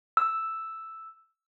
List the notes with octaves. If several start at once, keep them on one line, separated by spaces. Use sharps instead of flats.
E6